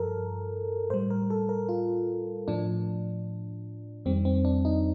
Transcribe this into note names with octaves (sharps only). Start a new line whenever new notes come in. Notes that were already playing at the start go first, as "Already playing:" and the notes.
Already playing: G2 F3 A4 A#4
A2 G3 C5
A#4
A4
A#4
F4
A2 F3 D4
F2 D#3 G3 C4
C4
D4
D#4